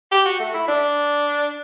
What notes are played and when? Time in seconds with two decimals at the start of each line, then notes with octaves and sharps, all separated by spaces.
0.11 G4
0.25 F#4
0.40 A3
0.54 E4
0.68 D4